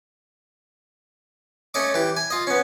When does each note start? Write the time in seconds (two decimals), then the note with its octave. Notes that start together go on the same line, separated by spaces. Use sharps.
1.74 A3 C#4 D#5 D6
1.94 E3 G4
2.17 G#5
2.31 F4 D#5
2.47 B3 C#4